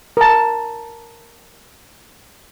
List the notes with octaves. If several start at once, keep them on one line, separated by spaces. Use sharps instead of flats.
A#4 A5